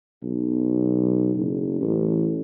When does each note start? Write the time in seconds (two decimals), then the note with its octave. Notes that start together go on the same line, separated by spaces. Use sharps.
0.23 B1
1.35 F#1
1.81 A1